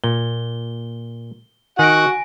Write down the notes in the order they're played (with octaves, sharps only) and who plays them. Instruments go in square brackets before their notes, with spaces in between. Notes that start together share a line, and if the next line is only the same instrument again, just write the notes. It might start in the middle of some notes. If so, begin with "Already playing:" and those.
[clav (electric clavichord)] A#2 [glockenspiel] G7
[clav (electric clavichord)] D#3 [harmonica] F#4 F#5 [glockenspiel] G#5 A#6 D7